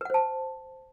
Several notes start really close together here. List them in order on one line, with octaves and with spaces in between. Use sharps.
B4 F#5 C5 A5